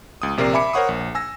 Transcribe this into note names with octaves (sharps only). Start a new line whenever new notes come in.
C#2 D#6
A#1 C3 A#4 D5 C7
E5 G#5 B5 D6 C#7
A#4 C5 C#5 F#5 C#6 D#6
A#1
G#5 E6 A#6